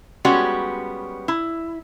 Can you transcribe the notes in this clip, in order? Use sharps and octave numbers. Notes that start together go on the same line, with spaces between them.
G3 G#3 B3 C#4 F#4
E4